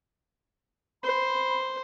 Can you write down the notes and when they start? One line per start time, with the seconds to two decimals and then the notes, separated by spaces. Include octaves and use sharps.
1.04 C5 B5